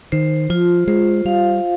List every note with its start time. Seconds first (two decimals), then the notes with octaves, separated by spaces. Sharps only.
0.12 D#3 C5
0.50 F3 F4
0.87 G#3 C5
1.25 G3 F5